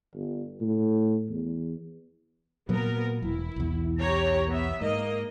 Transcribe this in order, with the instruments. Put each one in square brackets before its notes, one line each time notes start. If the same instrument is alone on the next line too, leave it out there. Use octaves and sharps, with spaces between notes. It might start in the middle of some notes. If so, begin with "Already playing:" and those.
[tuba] G1
A2
E2
[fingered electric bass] A#2 F#3 A#3 [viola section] B3 A#4
[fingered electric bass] E1 [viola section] E4
[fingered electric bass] B1 E2
[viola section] G4 C#5 A#5
B3 E5
[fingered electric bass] G#2 [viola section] A#3 D#5